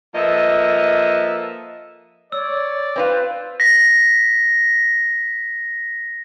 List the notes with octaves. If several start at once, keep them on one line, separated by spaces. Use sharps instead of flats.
F3 A#3 A4 B4 D#5 E5
C#5 D5 E6
C4 E4 F4 B4
A#6 B6